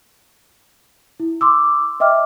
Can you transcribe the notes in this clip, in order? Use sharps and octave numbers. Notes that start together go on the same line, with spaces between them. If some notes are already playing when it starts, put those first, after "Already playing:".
E4
C6 D6 E6
D#5 E5 G5 D6 F6